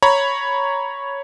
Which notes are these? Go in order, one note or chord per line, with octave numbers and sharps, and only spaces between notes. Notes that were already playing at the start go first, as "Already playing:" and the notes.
C#5 A#5 B5